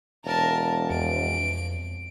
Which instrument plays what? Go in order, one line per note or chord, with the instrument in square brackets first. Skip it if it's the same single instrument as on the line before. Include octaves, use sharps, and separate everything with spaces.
[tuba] E1 [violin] A#4 A5
[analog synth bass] F2 [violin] D7